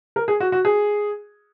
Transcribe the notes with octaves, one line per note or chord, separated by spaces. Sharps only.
A#4
G#4
F#4
F#4
G#4